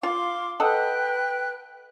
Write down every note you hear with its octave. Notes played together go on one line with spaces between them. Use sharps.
F4 F5 C6 D6
A4 B4 D#5 F#5 G5 F#6